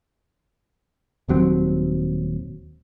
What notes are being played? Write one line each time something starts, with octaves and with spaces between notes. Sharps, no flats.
D#1 D#2 F#3 C4